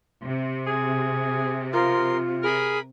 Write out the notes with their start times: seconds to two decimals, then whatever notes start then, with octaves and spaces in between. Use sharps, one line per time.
0.26 C3
0.67 G#4
1.73 F3 F4 A#4 C6
2.43 G#4 A#4 B5 F6